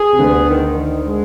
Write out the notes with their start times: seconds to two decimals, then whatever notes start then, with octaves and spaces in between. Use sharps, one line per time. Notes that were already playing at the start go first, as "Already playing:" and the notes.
Already playing: G#4
0.12 C3
0.19 D2 D3 B3
0.48 D#3
0.77 D#3
1.06 G#3